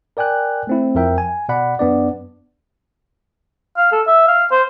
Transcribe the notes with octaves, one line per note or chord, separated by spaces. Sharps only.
A#4 D5 G5 G#5 F#6
A3 C4 E4
F2 F3 A#4 E5 G5
G#5
B2 D5 F#5 B5
F#2 B3 D4 D5
F5
A4
E5
F5
C5